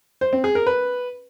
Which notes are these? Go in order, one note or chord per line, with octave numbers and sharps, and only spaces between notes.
C5
C4
G#4
A#4
B4